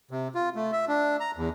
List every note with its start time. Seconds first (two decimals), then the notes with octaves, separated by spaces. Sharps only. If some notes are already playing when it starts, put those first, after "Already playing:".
0.11 C3
0.35 F4
0.56 A3
0.72 E5
0.88 D4
1.20 A#5
1.37 E2